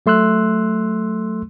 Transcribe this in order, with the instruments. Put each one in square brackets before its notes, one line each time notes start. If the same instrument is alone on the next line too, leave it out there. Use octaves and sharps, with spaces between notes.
[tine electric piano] F#3 A3 C6 E6 F#6